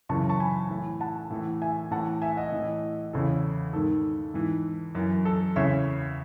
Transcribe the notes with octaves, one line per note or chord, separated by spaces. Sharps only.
F#2 C#3 E3 A5 C#6
A5 C#6
G#5 B5
A2 E3
F#5 A5
A2 E3
E5 G#5
A2 E3 F#5 A5
E5 G#5
D#5 F#5
A2 E3
E2 C#3 E3 A4
G#2 D#3 A4
G#2 E3
F#2 E3
A4
E2 C#3 E3 C#5 E5